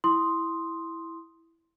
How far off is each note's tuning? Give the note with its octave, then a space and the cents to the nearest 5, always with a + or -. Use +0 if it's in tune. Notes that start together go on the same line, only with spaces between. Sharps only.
E4 +0 C6 +0 D#6 +0